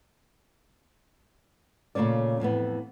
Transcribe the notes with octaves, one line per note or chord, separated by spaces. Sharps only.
A#2 C#3 A3 C#4 D5
F2 A2 E3 B3